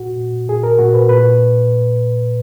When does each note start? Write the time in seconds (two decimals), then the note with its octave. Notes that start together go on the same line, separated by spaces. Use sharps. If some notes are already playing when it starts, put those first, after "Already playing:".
Already playing: A#2 F#4
0.18 A#2
0.48 A#2 G#4
0.63 A#4
0.79 A#2 F#4
0.94 B4
1.09 A#2 B4